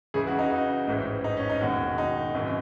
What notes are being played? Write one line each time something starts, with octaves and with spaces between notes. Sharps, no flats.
C#2 C#3 E3 G#4
F#4
D#4
D#4
A1 G#2 E3
D#4
C#4
D#4
E1 D#2 D#3 F#4
D#4
G#1 F#2 E3